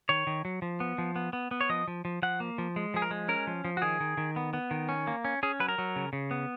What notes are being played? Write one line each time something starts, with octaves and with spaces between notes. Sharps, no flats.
D#3 C#5
D#3
F#3
F3
B3
F3
B3
B3
B3
C#5
F3 D#5
F3
F3
F3 F#5
A#3
F3
G#3
F3 G#4
A#4
G#3
C#4 A#4
F3
F3
F#4
D#3 G#4
D#3
D#3
B3
B3
D#3
C#4
A#3
C#4
C#4 G#4
F#3 B4
A#4
F#3
C#3
C#3
B3